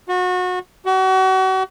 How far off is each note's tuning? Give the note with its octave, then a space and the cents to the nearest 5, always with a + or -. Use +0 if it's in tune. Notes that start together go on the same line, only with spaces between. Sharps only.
F#4 -30
F#4 +35